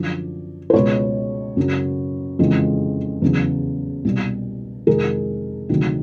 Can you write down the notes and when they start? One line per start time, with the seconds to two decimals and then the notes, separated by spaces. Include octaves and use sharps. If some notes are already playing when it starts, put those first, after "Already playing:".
Already playing: F#2 D3 F3 D5
0.70 C5
0.74 C#2 B2 G#3 B4 C#5
1.57 F#2 C#3 F#3
2.39 F2 C#3 E3 G#3
3.22 E2 C#3 F#3
4.05 C2 B2 G3
4.87 F2 C3 D#3 G#3 G#4 A#4
5.69 D2 C3 D#3 F#3